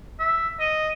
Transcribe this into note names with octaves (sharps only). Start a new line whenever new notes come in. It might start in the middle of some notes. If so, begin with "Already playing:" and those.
E5
D#5